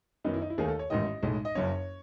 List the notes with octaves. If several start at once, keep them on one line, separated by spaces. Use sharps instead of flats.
F#2 D#3 F#3 B3 D#4
E4
D#4
E4
D#2 D#3 A3 G#4
A4
C#5
A1 G#2 D#3 D#5
B1 A2 G#3
D#5
F#1 F#2 C#3 C#5